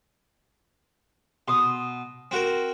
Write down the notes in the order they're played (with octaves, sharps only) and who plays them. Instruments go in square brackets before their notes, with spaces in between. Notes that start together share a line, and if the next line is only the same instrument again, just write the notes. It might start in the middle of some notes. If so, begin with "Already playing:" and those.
[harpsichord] B2 [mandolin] C6 D#6
[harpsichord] C4 F#4 A#4